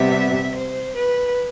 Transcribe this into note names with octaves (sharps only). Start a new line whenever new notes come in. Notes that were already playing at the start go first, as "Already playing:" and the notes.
Already playing: C3 G3 B3 E5
C5
B4